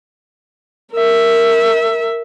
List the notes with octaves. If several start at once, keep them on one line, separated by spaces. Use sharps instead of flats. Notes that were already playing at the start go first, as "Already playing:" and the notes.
A#4 E5